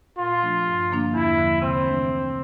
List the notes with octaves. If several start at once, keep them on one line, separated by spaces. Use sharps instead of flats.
A#2 F4
F3 A3 D4
G2
D3 F3 A#3 D4
E2 E4
D3 F3
C3 C4
E3 A3 D4
C3